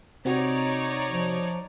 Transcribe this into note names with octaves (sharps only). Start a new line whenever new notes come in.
C3 C4 D#4 F#4 C#5 D5
F3